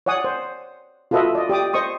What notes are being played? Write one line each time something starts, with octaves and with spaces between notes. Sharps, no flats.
C#5 D5 F#5 G#5 D#6
C5
F4 F#4 A4 B4 D#5 E5
D5 D#5
G4 D5 D6 D#6
C5 D#5 C#6 D#6